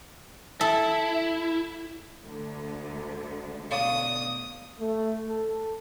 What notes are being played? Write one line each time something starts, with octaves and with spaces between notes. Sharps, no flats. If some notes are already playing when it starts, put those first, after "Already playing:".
E4 A4
D2 D3
B2 D5 F5 D#6
A3
A4